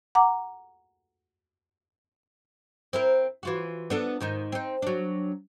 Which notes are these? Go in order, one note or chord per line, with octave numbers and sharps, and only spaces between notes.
F#5 A#5 D6
C4 E4 A#4
E3 F4 F#4
B3 D4 A4
G#2 D#3 D#4
C4 D#4
F#3 D4